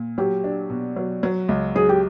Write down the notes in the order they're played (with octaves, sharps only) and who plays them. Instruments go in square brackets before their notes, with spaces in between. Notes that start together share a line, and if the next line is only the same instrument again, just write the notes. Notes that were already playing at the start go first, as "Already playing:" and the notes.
Already playing: [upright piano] A#2
[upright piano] F#3 [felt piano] G4
[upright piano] D4
B2
F#3
F#3
C#2
[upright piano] F#3 [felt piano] G#4
[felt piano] G4